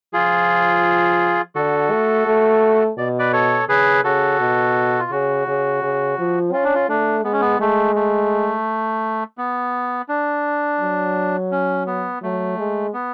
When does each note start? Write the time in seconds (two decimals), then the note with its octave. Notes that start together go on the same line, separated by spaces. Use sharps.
0.13 F3 F4 G#4
1.55 D3 F#4 A4
1.91 A3
2.27 A3
2.98 B2 D5
3.19 B4 D5
3.33 A4 C#5
3.69 C#3 G#4 B4
4.04 C#3 F#4 A4
4.40 B2
5.00 F4
5.11 C#3 F#4
5.47 C#3
5.83 C#3
6.18 F3
6.53 C#4 F4
6.64 D4
6.75 F4
6.89 A3 D4
7.24 G#3 B3
7.33 C#4
7.41 B3
7.60 G#3 A3
7.96 A3
9.38 B3
10.09 D4
10.80 F#3
11.51 C#4
11.87 B3
12.22 F#3 A3
12.58 G#3
12.93 B3